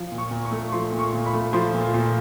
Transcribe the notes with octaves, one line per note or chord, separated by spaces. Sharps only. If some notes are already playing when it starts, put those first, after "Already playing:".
Already playing: F3
A#2
C#6
A#2
C#6
A3
F3 C6
A#2
C#6
A#2
B5
A3
F3 C6
A#2
A#2